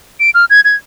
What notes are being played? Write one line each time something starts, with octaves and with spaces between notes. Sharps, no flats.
D7
F6
G#6
G#6